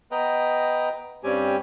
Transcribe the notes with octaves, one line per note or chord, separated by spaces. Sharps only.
B3 B4 D#5 G5 A#5
G2 G3 C4 C#4 G4 G#5